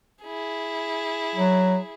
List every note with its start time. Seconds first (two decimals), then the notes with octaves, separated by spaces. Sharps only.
0.24 E4 G#4
1.36 F#3